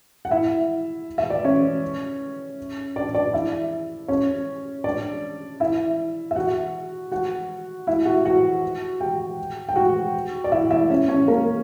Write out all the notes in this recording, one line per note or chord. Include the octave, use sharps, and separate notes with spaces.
F#5
E4 E5
E5
D5
C#4 C#5
D4 D5
D4 D5
E4 E5
C#4 C#5
D4 D5
E4 E5
E5
F#4 F#5
F#4 F#5
E4 E5
F#4 F#5
F#4 F#5
G4 G5
G5
F#4 F#5
D5
E4 E5
E4 E5
C#4 C#5
C#4 C#5
A#3 A#4